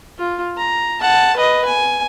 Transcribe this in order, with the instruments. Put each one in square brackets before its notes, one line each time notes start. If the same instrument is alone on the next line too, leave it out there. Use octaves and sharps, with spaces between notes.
[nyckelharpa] F4
A#5
F#5 A5
B4 D#5
G#5